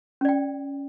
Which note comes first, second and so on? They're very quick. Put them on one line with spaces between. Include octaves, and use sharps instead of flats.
C#4 D5 G5